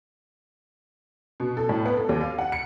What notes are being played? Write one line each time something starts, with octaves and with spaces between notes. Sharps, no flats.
B2
A4
A2
B3
A4
D#2
F5
F#5
C#7